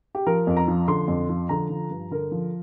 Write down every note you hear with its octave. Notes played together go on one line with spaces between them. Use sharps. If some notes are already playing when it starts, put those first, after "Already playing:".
G4
F3 A#4
F2
A#5
F3
D3 C6
F2
F3
D3 A#5
F3
G2
D3 A#4
F3